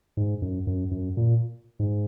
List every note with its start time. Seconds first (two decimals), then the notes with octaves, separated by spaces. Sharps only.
0.17 G#2
0.42 F#2
0.67 F#2
0.91 F#2
1.17 A#2
1.79 G#2